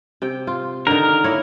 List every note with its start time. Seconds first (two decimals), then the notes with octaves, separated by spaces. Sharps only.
0.22 C3 G5
0.47 F4
0.87 D3 D#3 A#4
1.24 A#3 E4 C#5